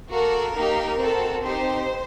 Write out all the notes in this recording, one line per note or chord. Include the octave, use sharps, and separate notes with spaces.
A#3 F#4 A4 A#4
A#3 D#4 G4
C4 F#4 A4
C4 D#4 G4 C5